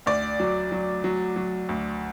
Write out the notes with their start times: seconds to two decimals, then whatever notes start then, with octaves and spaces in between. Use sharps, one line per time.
0.06 D2 D5
0.40 F#3
0.72 F#3
1.04 F#3
1.36 F#3
1.69 D2